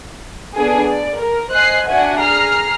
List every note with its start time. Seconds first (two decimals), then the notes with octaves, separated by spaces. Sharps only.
0.54 B3 D4 G#4 A4
0.88 D5
1.19 A#4
1.52 C5 D#5 G#5 F#6 C7
1.87 D4 F#4 E5 F#5 G#5
2.21 G#4 A#5 F6 C7